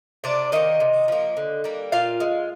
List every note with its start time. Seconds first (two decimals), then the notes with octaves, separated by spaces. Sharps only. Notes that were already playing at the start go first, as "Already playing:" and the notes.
0.24 C3 D4 D5
0.52 D#3 A#3 D#4 D#5
0.80 C3
1.08 F3 A#3
1.37 D3
1.64 G3 A#3
1.92 A#2 F4 F5
2.20 G#3